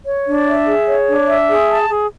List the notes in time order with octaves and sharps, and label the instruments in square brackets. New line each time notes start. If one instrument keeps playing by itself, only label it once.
[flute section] C#5
D4
E5
G#4
C#5
D4
E5
G#4
A5
G#4